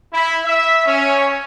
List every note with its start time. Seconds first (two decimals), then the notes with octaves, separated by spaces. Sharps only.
0.13 E4
0.45 E5
0.86 C#4